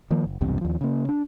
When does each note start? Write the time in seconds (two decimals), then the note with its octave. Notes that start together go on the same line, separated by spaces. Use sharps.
0.11 D#3 F3 A#3
0.25 F#1
0.41 B1 E2 G2 C3
0.61 D#2 F3
0.81 C#3 A#3
1.09 D4